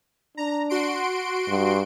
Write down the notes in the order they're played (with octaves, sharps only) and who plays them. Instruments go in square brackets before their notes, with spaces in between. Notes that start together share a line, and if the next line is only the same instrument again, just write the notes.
[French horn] D4 [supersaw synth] A#5
[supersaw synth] F#4 C6 D7
[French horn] G2